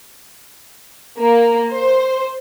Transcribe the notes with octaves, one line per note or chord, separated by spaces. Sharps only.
A#3
C5